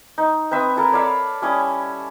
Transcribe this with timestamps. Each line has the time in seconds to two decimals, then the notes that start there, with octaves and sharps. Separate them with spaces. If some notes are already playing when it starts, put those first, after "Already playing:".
0.18 D#4
0.51 C4 B4 E5 D#6
0.76 E4 A4 A#4
0.92 C#5 D5 F5 B5
1.42 G3 C#4 E4 D#6